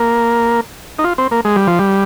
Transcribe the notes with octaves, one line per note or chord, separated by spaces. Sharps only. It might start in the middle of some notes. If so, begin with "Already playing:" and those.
Already playing: A#3
D#4
F4
C4
A#3
G#3
G3
F3
G3